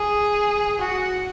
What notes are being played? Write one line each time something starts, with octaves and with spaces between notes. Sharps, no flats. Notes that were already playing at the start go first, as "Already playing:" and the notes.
Already playing: G#4
F#4